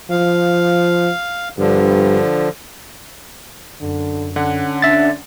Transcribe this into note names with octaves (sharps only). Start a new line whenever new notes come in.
F3 F5
G2 D3 F3
F#2 D3
D3 C#4 F#5
D4 E5 A6